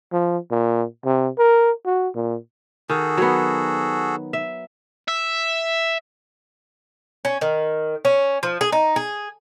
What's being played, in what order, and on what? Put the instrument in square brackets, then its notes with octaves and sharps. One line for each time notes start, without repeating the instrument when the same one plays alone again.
[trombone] F3
A#2
C3
A#4
F#4
A#2
[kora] D#3 [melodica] F#4 G#4 A4
[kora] F#3 B3
E5
[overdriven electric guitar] E5
[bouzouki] C#4
D#3
C#4
F3
G#4
D#4
G#4